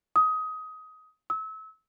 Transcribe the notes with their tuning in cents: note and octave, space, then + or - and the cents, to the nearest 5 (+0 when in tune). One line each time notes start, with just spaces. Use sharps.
D#6 +20
E6 -30